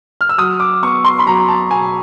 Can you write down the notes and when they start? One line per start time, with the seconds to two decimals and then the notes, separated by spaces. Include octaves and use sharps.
0.21 F6
0.29 E6
0.38 F#3 D#6
0.60 D6
0.82 B3 C#6
1.04 C6
1.19 B5
1.27 F#3 A#5
1.48 A5
1.71 B2 G#5